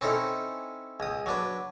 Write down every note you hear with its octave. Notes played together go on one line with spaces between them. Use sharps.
C4 C#4 D#4 E4 A4
C#2 D#6
F#3 D4 B4